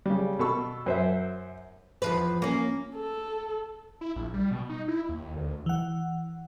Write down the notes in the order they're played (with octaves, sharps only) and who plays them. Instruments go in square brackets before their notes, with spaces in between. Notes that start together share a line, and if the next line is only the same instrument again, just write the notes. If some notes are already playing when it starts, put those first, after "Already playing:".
[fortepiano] C#3 G3
B2 A4 C#6 E6
F#2 C5 E5
[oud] E2 F3 B4
A#3 C#4
[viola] A4
[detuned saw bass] E4
A#1
G3
B2
D#4
E4
D#2
D2
[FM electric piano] E3 F#5